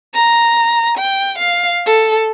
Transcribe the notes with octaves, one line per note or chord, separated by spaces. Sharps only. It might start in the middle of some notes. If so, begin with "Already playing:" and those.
A#5
G5
F5
A4